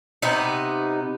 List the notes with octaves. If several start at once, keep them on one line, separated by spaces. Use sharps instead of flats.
C3 B3 D#4